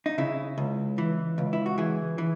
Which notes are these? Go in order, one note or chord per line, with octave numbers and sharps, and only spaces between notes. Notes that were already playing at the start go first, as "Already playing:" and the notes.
D#4
C#3 E4
C#2
E3
C#2
E4
F#4
E3 G#4
E3